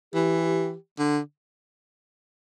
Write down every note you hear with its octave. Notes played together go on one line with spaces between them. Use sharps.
E3 G4
D3